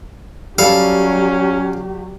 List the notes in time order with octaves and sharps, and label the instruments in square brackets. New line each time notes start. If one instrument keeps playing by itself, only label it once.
[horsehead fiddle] F#3 G4 [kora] G3 A4 [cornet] C#4 [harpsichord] F5